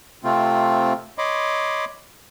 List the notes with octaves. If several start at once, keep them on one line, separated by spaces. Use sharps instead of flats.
C3 A3 C4 F4
C#5 D#5 B5 C6 D6